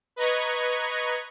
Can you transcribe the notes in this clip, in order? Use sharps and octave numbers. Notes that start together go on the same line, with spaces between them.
B4 D#5 A#5 C#6 G#6